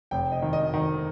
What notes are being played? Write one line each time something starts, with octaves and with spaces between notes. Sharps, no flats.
F1 G5
D#5
D#3
D#5
D#3